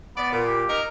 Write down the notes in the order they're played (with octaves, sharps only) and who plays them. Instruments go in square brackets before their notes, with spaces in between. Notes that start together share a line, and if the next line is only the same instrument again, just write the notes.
[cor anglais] B3 [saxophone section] D5
[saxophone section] A#2
[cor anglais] G4
[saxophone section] D#4 A#4